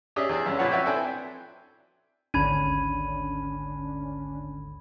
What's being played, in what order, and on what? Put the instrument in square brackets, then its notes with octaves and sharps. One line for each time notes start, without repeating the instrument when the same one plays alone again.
[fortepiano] C#4 D4 G4 G#4 D#5 E5
E2 D4 G#4 E6
C#2 F#2 C#4
A#2 F3 C4 B4 C#5 F#5
F#4 B4 C#5 E5 G5
C4 D4 E4 A4 G5 G#5
[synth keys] G#1 D2 D3 [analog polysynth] C#4 D4 [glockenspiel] B5 G#6 D#7